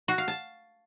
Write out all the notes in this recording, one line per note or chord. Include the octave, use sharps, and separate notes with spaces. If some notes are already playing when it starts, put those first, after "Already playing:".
F#4
F5
A5